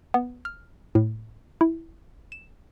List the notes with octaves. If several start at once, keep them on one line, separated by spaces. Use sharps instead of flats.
B3
F6
A2
E4
E7